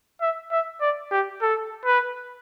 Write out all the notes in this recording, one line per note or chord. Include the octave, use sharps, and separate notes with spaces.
E5
E5
D5
G4
A4
B4